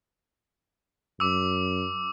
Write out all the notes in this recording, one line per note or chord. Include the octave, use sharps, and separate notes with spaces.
F#2 D6 E6